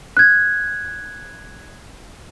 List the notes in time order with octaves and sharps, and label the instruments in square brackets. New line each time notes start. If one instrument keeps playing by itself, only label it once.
[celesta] F#6 G#6